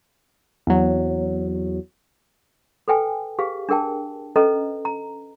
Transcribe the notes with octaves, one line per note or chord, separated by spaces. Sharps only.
E2 F#3
A4 B4 G5 G#5
G4 G#4 B4 F5
D4 G#4 A#4 G5 A5
C#4 A4 B4 D#5 A#5
A#5